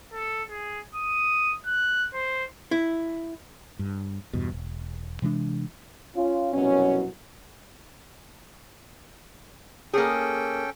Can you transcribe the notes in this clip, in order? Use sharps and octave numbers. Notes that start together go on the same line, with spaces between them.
A4
G#4
D#6
F#6
C5
E4
G2
E2 G2 B2
E1
C3 E3 G#3 D4
C#4 F4
C2 F#2 B2 F#3 C#4
A#3 C#4 G#4 A4 G5